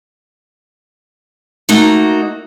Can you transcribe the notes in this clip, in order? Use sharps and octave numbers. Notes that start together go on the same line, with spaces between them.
A3 A#3 D#4 F#4